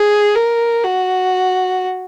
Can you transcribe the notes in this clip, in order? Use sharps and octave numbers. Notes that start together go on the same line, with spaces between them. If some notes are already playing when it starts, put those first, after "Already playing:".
Already playing: G#4
A#4
F#4